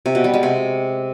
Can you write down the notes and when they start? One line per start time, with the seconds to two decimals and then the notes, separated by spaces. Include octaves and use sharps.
0.06 C3
0.15 B2
0.24 G3
0.34 G#3
0.43 C3